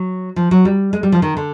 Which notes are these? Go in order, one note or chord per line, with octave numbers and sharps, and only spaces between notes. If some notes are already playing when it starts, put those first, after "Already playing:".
Already playing: F#3
F3
F#3
G3
G#3
G3
F3
D#3
D3